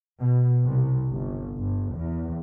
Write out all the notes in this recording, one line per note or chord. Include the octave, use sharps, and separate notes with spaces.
B2
C2
G1
G1
E2